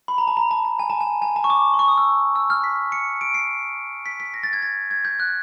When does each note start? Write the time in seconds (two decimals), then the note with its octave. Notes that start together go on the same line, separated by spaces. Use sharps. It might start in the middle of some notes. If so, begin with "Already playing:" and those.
0.08 B5
0.18 A#5
0.27 A5
0.37 A#5
0.51 A5
0.65 A5
0.79 G#5
0.90 A5
1.01 G#5
1.22 G#5
1.36 A5
1.44 C#6
1.50 D6
1.74 C6
1.79 C#6
1.88 D#6
1.98 E6
2.35 E6
2.50 F6
2.64 B6
2.92 C#7
3.21 D7
3.34 C7
4.06 B6
4.20 B6
4.34 A#6
4.43 A6
4.53 G#6
4.62 A6
4.91 G#6
5.05 G6
5.20 F#6